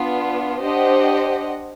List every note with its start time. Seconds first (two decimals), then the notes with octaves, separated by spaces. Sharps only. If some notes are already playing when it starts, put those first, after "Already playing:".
Already playing: B3 D4 F4
0.61 D4 G4 C5 D#5 F#5